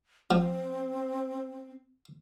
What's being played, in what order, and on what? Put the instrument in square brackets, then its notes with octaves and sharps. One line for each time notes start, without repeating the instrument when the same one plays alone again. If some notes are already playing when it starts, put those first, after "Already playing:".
[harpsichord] F3 [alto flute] C4